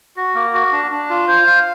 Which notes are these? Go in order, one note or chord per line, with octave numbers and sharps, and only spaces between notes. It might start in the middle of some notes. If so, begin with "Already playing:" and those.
F#4
A#3
F#4
D4
D4
F4
C5
F5